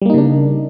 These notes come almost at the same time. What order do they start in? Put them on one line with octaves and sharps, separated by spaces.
G3 A#3 D#4 C#3 D4